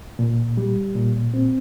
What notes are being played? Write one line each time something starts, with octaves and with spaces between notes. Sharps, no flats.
A#2
G3
A#2
C4